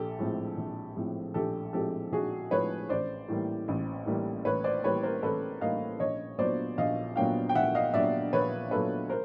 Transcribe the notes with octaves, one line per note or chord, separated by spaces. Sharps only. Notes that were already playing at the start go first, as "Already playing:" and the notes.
Already playing: A#1 G4 A4
A2 F3 G#3 C4
A#1
A2 F3 G#3 C4
A#1 G4 A4
A2 F3 G#3 C4 G4 A4
A#1 F#4 G#4
A2 F3 G#3 C4 B4 C#5
A1 C5 D5
A2 E3 G3 A#3
A1
A2 E3 G3 A#3
A1 B4 C#5
C5 D5
A2 E3 G3 A#3 B4 C#5
A#4 C5
A1 A4 B4
A2 E3 G3 A#3 D#5 F5
A#1 C#5 D#5
A#2 F#3 B3 D4 C5 D5
A#1 D#5 F5
A#2 F#3 B3 D4 F5 G5
G5
A#1 E5 F#5
D#5 F5
A#2 F#3 B3 D4 D5 E5
A#1 B4 C#5
A#2 F#3 B3 D4 A4 B4
A#4 C5